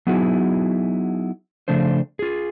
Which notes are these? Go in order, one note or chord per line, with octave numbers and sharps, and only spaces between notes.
F#3 B3 D#4 E4 F#4 G#4
C#3 F3 A3 D4 C5
F4 G#4